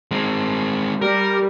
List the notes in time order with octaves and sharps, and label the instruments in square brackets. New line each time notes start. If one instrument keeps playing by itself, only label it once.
[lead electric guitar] G#3 C4
[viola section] G3 [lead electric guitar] A#4